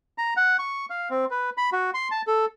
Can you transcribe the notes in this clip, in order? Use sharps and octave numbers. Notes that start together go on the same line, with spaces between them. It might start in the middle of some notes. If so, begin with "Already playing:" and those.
A#5
F#5
C#6
F5
C4
B4
B5
F#4
C6
A5
A4